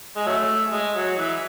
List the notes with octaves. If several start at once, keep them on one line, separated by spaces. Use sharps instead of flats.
G#3
F#3 A3
G#3
F#3
E3